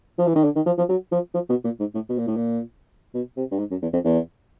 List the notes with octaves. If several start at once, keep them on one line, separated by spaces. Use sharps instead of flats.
F3
E3
D#3
D3
D#3
F3
F3
F#3
F3
F3
B2
A#2
G#2
A2
B2
A#2
A2
A#2
B2
C3
G2
G#2
F#2
E2
F2
E2